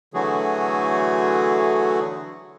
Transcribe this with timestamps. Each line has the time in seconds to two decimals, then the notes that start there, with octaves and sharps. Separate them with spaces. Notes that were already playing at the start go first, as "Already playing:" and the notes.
0.14 D3 E3 F#3 A3 F#4 G#4